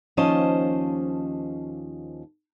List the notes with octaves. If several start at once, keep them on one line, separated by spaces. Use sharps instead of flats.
D#2 F3 C#4 C5 D#5 A5